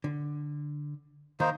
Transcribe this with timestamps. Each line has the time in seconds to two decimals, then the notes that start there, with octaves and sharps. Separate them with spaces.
0.04 D3
1.40 D#3 A#3 D#4 C5